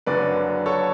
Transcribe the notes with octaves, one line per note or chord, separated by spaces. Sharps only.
F#1 F#2 D3 B4 D5
A4 C#5